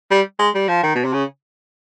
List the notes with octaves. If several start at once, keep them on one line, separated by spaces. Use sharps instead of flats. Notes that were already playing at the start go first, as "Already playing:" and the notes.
G3
G#3
G3
F3
D#3
B2
C3
C#3